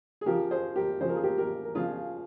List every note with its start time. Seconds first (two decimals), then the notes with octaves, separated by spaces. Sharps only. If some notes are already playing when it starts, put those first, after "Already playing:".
0.21 G#4
0.26 C#3 F3 G4 A#4
0.51 G#4 C5
0.76 G4 A#4
1.01 C#3 C5
1.05 F3 A#4
1.16 G#4
1.23 G4 A#4
1.38 G4 A#4
1.65 A#4
1.75 C#3 F3 F4 G#4